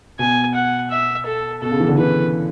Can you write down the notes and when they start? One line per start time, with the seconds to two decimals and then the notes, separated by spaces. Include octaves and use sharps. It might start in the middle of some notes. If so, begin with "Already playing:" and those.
0.19 B2 G#5
0.55 F#5
0.91 E5
1.26 A4
1.62 B2 A4
1.71 C#3
1.80 E3
1.89 D3
1.98 E3 B4